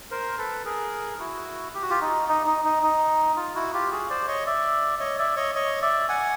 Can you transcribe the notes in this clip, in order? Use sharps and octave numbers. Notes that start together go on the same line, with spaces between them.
A#4 C5
A4 B4
G#4 A#4
E4 F#4
G4
F#4
F4 G4
D#4
D#4
D#4
D#4
D#4
F4
E4 F#4
F4 G4
F#4 G#4
C5 D5
C#5 D#5
D5 E5
C#5 D#5
D5 E5
C#5 D#5
C#5 D#5
D5 E5
F#5 G#5